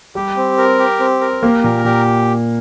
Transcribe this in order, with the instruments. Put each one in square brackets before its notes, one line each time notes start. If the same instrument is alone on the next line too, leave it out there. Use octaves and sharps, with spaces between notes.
[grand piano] G3 [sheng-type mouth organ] G4
[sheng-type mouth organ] C4
A#4
G4
C4
A#4
[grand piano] A#3 [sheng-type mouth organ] G4
[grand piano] A#2 [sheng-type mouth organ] A#4
[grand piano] A#2 [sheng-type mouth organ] G4